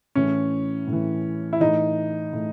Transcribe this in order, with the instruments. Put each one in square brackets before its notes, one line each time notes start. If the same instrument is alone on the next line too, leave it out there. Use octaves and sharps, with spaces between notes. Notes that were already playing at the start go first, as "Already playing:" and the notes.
[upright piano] A2 E3 C#4
A2
E3
E4
A2 E3 D#4
A2